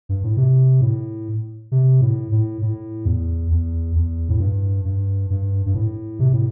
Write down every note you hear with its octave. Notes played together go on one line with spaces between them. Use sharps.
G2
A2
C3
A2
C3
A2
A2
A2
E2
E2
E2
A2
G2
G2
G2
G2
A2
C3
A2